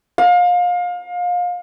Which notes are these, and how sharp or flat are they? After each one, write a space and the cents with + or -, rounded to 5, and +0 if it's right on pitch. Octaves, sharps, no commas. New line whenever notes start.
F5 +30